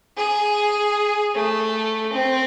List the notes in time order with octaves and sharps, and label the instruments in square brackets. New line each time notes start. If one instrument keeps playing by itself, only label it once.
[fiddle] G#4
A3
C4